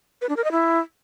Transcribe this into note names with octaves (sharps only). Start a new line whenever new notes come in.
B4
D4
A#4
D#5
E4